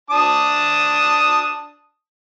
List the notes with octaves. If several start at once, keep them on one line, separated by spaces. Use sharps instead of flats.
D4 A5 D#6